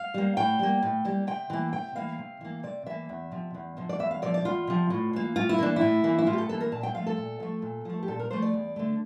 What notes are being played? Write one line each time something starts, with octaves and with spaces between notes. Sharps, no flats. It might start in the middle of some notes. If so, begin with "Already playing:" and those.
Already playing: F5
G3 A#3
A2 G5
G3 A#3
A2
G3 A#3
C3 G5
E3 A#3
C3 G5
E3 A#3 F5
C3
E3 A#3
C3 D5
E3 A#3 E5
E2
C3 F3
E2
C3 F3
D5
E2 E5
F5
C3 F3 D5
D5
E2 F4
C3 F3
A2
E3 A#3
A2 F4
E4
E3 A#3 D4
A2 E4
E3 A#3
E4
A2 F4
G4
A4
E3 A#3 A4
A#4
A#2 A5
G5
F3 A3 F5
A4
A#2
F3 A3
A#2
F3 A3
G4
A#2 A4
A#4
F3 A3 C5
D5
E2
D3 A3